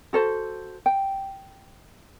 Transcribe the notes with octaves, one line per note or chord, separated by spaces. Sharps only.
F#4 A4 C5
G5